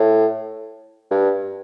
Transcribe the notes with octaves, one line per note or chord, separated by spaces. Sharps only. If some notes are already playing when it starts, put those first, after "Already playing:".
Already playing: A2
G2